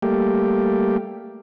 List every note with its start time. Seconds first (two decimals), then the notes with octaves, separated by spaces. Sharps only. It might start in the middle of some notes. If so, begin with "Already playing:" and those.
0.02 G3 A3 A#3 G4